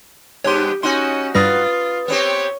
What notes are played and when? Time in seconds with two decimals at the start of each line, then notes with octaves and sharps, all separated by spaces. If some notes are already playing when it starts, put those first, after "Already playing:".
0.44 G2 B3 G4 C#5 C6
0.83 C#4 D#4 F#4 C6
1.35 G2 G3 F4 B4 D#6 A6 A#6
2.08 B3 C4 G4 C#5